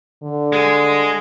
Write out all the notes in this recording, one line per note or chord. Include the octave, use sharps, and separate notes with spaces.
D3
G#3 G#4